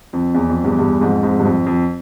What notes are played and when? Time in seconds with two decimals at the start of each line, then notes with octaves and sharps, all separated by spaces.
0.13 F2
0.35 E2
0.49 F2
0.64 E2 G2
0.79 E2 G2
1.01 F2 G#2
1.23 F2 G#2
1.39 G2
1.45 F2
1.66 F2